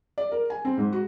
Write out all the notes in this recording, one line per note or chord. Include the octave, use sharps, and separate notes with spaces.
D5
A#4
G#5
C4
G#2
F#4